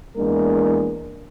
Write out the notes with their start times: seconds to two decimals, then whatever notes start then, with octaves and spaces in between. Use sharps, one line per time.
0.16 E2 G#3 A#3 D4 A#4